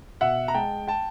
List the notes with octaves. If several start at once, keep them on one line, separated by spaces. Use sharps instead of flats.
B2 E5 F#5
A#5
G#3 G5 A5
G5 A5